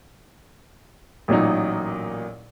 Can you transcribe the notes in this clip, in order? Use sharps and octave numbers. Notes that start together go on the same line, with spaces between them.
A1 A#2 F#3 D#4